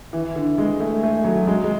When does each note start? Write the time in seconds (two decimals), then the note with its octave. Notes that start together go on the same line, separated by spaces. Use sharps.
0.13 E3
0.36 D3
0.58 G#3
0.80 A3
1.03 A3
1.25 F#3
1.47 G#3
1.64 G#3